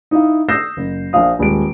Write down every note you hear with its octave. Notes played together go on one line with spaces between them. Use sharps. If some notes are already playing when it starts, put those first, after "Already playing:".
D#4 E4 F5
D#6 E6 G6 A#6 C7 E7
F#1
A#1 F3 F5 D#6
D#1 G#3 D7